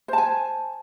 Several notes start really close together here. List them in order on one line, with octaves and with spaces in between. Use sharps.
C5 A5 G#5